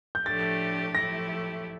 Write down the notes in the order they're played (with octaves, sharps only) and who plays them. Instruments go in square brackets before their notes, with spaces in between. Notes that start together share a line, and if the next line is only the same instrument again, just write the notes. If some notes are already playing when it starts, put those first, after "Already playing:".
[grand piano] G6
[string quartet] A2 F3 A3 D4 G4 [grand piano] A6
[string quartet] A2 F3 A3 E4 G4 [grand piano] A#6